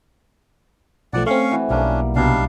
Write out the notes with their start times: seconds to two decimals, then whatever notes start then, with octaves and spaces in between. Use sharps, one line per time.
1.13 B1 F3 A3 D5 F#5
1.26 A3 C4 C#4 F5 C#6
1.51 E3 F#4
1.70 B1 G3 A#3 C#4 D4
2.16 C2 B2 G3 D4 D#4 F5 A5